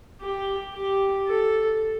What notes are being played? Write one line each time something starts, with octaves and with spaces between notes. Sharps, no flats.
G4
G4
A4